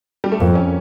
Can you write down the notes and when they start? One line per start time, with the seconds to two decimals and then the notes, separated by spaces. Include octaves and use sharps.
0.24 G3
0.32 A3
0.40 F2 A#3
0.55 C#4